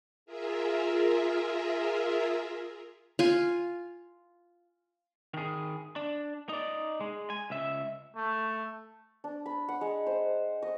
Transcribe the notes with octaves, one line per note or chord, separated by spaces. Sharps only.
F4 G#4 A#4 E5
F4 G#5
D#3 G#4
D4
D#4 D5
G#3
G#5
C#2 E5
A3
D4
B5
F#5
G#3
C5
D#5